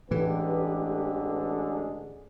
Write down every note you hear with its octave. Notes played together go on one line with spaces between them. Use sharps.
A1 A2 D3 E3 G#3 G4 B4